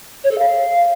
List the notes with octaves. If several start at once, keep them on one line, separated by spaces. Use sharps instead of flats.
C#5
A4
F5